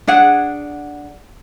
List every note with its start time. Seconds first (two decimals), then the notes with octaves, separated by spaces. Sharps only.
0.07 D4 G#4 F#5